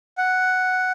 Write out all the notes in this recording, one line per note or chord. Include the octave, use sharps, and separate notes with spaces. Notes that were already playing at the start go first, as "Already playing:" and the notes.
F#5